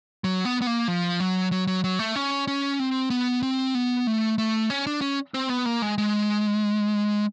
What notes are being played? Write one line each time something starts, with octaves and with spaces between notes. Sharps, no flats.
F#3
B3
B3
A#3
F3
F#3
F#3
F#3
F#3
A3
C#4
C#4
C4
B3
C4
B3
A3
A3
C#4
D4
C#4
C4
B3
A#3
G#3
G#3